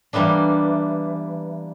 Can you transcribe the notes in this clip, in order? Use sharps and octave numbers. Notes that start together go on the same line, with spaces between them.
E3 G3 A#3 B3 D4